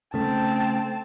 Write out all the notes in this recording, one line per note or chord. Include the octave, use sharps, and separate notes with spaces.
C#3 A3 C4 A5